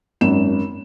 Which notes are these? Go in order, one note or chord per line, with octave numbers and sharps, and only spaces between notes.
G#1 F#2 E7